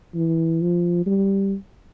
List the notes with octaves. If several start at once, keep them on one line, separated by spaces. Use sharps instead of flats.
E3
F3
G3